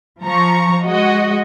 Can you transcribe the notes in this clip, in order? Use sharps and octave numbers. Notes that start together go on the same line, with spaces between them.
F3 A#5 C#6
G#3 F#4 D#5